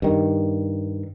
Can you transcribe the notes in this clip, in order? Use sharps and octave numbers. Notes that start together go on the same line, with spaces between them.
G2 D#3